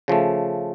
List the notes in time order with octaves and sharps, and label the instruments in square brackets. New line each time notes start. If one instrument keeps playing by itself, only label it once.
[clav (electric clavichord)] C#3 F3 A3